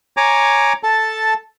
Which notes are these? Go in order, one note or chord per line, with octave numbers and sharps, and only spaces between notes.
C#5 G#5 A#5 D6
A4 A5